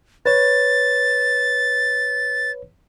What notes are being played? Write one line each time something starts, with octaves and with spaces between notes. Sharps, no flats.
B4 C#5 A6